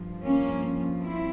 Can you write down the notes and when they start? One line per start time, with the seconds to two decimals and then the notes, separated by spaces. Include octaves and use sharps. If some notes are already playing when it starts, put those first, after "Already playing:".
Already playing: G2 F3
0.23 A#3 C#4
1.02 C4 E4